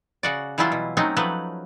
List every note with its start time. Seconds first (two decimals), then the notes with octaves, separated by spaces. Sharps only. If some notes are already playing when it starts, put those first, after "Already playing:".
0.23 C#3 F#4 D5
0.58 E3 F#3 G3 E4 F4
0.72 B2
0.97 F#3 A3 C4 C#4 D#4
1.17 F3 F#3 A3 B4